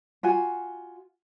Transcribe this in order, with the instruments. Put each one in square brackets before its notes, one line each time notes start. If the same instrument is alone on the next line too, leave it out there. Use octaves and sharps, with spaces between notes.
[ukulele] F4 F#4 G#5